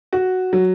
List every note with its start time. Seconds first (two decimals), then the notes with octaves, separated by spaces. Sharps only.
0.13 F#4
0.53 F#3